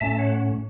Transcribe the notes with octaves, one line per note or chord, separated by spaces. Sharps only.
A2 A3 C#4 E5 A5
C#5 F#5